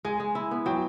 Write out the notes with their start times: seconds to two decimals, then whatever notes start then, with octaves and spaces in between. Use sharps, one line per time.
0.05 G#3 G#5
0.20 G#3
0.35 E4
0.51 B3
0.66 F#3 G5